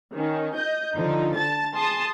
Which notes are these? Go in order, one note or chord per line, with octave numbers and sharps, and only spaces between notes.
D#3 C#4
D#5 G6
D3 F3 D#4
A5 A6
G#4 A5 C6 D#6